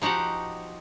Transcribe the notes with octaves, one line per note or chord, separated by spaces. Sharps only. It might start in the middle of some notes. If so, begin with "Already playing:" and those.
F3 D#4 F#4 G4 F#5